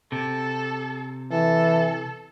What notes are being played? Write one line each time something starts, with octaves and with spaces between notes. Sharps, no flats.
C3 A4
E3 A4